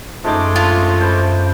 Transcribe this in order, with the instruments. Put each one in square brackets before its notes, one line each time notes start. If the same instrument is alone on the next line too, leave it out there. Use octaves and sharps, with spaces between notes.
[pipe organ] F#2 [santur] F3 D#4 D6 [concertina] G#3 A3
[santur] D4 [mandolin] F4
[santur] C5 D5 B5